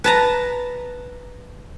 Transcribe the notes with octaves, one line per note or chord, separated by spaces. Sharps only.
B4 A5 A#5